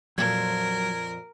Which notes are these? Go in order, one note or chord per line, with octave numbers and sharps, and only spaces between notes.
F2 A#2 F3 F#3 A#4 G#6